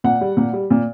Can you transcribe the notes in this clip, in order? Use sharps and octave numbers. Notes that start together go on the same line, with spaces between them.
A#2 F#5
G3
A#2
G3
A#2